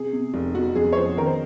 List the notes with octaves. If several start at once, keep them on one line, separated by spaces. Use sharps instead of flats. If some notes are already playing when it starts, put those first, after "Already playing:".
Already playing: C3 G#4
C3
F1
F2 F#4
F2 G#4
C#5
F3 C5
D#3 A#4
C5